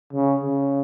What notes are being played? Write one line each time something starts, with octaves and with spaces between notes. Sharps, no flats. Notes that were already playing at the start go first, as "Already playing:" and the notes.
C#3
C#3